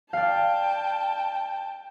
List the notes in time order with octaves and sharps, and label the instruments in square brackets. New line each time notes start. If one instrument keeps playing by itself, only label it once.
[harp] D5 F5 [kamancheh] G5 A5